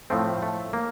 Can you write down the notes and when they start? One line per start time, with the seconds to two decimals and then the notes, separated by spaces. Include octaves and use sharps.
0.10 A2 F3 A3 C4
0.42 A3
0.73 A#3